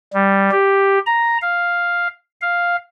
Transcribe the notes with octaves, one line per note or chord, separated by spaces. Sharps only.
G3
G4
A#5
F5
F5